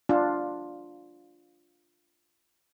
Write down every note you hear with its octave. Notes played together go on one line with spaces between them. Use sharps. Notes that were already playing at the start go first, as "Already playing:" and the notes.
D4 F4